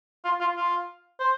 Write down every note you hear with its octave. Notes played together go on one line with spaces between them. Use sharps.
F4
F4
F4
C5